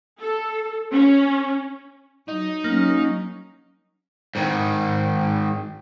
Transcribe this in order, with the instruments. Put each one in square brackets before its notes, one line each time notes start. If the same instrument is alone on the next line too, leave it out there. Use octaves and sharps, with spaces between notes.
[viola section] A4
C#4
[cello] F#3 [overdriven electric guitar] D#4
[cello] F#3 C#4 [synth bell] A#3
[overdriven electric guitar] G#2 D#3